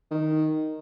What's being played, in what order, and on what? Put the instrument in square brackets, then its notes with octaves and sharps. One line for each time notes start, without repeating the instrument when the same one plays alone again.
[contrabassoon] D#3